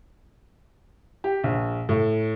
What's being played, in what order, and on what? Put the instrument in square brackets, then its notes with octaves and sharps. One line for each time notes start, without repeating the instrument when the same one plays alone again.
[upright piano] G4
A#1
A2